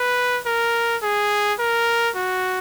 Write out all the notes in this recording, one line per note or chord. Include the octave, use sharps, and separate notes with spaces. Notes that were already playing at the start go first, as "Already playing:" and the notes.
Already playing: B4
A#4
G#4
A#4
F#4